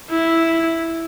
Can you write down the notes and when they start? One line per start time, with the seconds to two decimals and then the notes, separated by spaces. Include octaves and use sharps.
0.10 E4